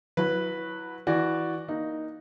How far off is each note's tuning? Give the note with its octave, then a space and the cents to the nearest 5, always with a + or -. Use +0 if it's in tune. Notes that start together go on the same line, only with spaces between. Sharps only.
F#3 -20 E4 +0 B4 -5
E3 -10 F#4 +0 D5 +0
A#3 +15 D#4 +0